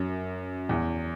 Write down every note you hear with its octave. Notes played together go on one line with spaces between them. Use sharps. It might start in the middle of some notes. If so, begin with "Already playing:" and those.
Already playing: F#2
E2